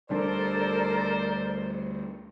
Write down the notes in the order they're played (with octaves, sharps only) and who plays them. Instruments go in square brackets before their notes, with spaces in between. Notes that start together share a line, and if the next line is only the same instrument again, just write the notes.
[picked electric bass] D2 G3 D4 [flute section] A4 A#4 D5 [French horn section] C5